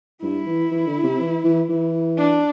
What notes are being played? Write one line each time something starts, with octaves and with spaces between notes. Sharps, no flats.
G2 E4
E3
E3
D3
C3
E3
E3
E3
D4